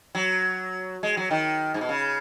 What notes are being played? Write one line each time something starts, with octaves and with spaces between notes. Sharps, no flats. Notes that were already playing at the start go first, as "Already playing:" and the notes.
F#3
G#3
F#3
D#3
G#2
B2
C#3